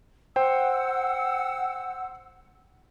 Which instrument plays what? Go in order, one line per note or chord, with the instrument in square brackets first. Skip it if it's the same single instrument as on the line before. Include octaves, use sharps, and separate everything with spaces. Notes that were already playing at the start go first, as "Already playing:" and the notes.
[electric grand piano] C5 G5 [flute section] F#5 E6